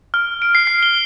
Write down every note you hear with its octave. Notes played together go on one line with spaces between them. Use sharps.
F6
D7
C7
C7
G7